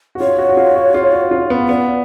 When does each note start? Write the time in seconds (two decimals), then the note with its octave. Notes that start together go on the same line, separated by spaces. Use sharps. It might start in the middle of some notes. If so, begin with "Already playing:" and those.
0.15 F#4
0.20 F4 C#5
0.38 F#4
0.49 F#4
0.57 F4
0.76 F#4
0.94 F4
1.13 F#4
1.31 F4
1.50 B3
1.68 B3 D5